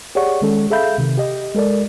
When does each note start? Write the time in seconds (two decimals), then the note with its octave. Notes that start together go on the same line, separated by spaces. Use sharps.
0.15 G4 G#4 C#5 D5 F#5 C#6
0.42 D#3 G#3 C#4 A4
0.71 G#4 A4 E5 F5 B5 G6
0.98 C3 D#3
1.17 G4 D#5
1.54 G#3 A4 A#4 D5